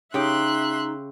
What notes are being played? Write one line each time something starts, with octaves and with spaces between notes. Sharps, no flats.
C#3 D#4 G4 E5 G5 C6 F#6